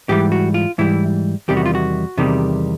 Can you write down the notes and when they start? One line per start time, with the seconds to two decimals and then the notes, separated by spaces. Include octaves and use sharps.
0.09 G#2 E3 G3 G4
0.32 F#4
0.54 F4
0.78 G#2 E3 G3 E4
1.48 E2 C3 D#3 G3 G4
1.57 F#4
1.66 F4
1.75 F#4
2.17 E2 C3 D#3 G3